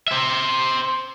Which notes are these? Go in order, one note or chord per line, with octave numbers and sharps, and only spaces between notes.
C5 E5